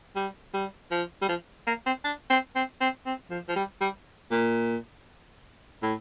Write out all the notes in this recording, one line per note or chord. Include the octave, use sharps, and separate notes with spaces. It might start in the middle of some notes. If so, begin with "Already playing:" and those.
G3
G3
F3
G3
F3
A#3
C4
D4
C4
C4
C4
C4
F3
F3
G3
G3
A#2
A2